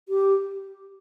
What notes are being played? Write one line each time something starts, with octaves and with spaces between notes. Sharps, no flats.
G4